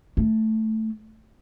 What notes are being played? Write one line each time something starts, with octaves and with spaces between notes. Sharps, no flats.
A3